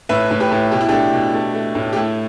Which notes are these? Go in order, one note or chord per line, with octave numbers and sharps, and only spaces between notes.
A2 B4 E5
A2
G4 B4
A2
B2 G4
E4
A3 D4 G4
B2
A3
A3
A2
G4
A3 E4